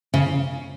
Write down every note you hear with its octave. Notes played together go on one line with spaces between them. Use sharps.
C#3